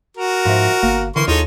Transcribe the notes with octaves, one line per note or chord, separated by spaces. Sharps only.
F#4 A#4
G#2 F3 E5
G1 A#3
D3 E3 A#3 C6 C#6
D#2 D#4 F4 G#4 A4 C#5